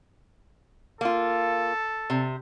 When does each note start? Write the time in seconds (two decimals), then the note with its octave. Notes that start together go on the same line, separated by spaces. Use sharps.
1.01 A#3 F4 A4
2.10 C3